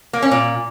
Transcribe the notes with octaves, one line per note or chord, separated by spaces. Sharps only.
A#3
C#4
A#2